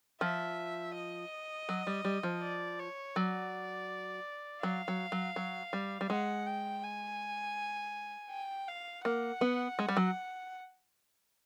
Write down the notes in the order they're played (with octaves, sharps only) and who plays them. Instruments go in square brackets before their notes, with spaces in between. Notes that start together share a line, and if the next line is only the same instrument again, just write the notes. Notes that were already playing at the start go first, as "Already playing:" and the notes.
[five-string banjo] F3 [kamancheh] E5
[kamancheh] D#5
[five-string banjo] F#3
G3
G3
F3
[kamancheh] D5
C#5
[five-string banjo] F#3 [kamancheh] D5
[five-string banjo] F#3 [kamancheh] F5
[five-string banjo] F#3
F#3
F#3
G3
G3
[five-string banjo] G#3 [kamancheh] F#5
[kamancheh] G5
G#5
G5
F5
[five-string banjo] A#3 [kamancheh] F#5
[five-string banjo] B3
G#3
G3
F#3